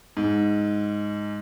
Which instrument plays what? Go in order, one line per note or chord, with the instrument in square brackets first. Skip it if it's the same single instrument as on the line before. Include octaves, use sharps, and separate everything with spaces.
[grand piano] G#2